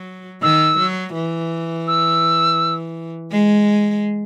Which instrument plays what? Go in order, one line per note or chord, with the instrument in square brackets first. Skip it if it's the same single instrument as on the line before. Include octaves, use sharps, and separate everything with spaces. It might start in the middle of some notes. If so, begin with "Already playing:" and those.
Already playing: [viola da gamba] F#3
[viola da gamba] D#3 [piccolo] E6
[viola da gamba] F#3
E3
[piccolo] E6
[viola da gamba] G#3